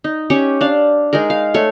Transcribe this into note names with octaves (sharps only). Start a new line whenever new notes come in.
D#4
C#4 G4 C#5
D4 F5
G#3 D#4 G#4 A#4
F5
A3 C#5